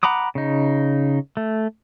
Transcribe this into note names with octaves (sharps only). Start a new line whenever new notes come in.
F#5 A#5 B5 D6 D#6
C#3 D#4
A3